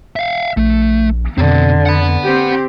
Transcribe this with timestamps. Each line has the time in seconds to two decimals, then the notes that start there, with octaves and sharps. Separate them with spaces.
0.16 E5 F5
0.57 A#1 A3
1.38 F2 B2 D3 C4
1.86 F#5 B5
2.23 C4 G4